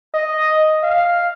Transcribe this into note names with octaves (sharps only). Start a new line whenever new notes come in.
D#5
F5